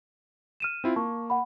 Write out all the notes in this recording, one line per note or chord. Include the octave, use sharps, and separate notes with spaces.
F6 D#7 E7
C4 E4 F4
A#3 A5 C#6
F#5 B5